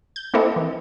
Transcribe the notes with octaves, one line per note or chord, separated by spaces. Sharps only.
G6
A#3 C4 E4 A4 D#5
E3